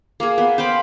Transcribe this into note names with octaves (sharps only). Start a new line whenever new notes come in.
A#3 G#4
B3
C5 F5 G5 B5